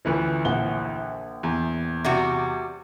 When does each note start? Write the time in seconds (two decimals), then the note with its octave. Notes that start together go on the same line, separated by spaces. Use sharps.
0.05 D2 E3 F3 C#4 B4
0.45 A#1 F#5 G7
1.43 E2
2.04 C3 G3 F#4